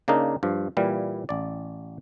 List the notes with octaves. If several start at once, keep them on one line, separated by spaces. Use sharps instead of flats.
C#3 A#3 D4 D#4 A#4
G2 F3
A#2 E3 G3 F5
A1 D5